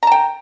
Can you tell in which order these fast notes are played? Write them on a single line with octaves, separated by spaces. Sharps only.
A#5 A5 G5